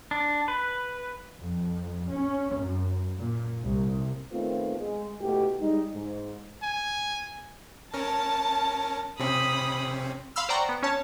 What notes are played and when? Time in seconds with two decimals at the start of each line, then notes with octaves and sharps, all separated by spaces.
0.11 D4
0.48 B4
1.41 F2
2.10 C#4
2.55 F#2
3.17 A#2
3.63 C2
4.32 D#3 A3 B3 C4 F4
4.78 G#3
5.21 B2 A3 E4 G4
5.60 G3 G#3 D#4
5.94 G#2
6.62 G#5
7.94 C#4 A#4 A5
9.20 C3 C4 C#4 B5 D#6
10.36 F5 B5 C6 E6 F6
10.49 C5 D5 F#5 G5 A#5 C#6
10.69 B3
10.83 C#4 C#5 A5